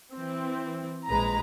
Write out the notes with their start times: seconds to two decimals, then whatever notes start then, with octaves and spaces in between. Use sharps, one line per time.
0.14 E3 C4
1.09 A#1 G#3 B4 A#5